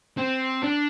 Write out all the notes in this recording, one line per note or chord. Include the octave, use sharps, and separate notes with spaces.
C4
D4